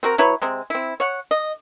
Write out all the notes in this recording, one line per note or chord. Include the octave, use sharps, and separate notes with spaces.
C4 F#4 A#4
F#3 E4 B4 C#5
C3 G#3 C4
C4 E4
C#5 F#5
D#5